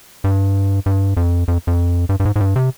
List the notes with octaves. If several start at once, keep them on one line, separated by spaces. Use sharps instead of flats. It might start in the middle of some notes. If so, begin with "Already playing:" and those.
G2
G2
F2
F2
F2
G2
G2
G#2
G#2
G2
C3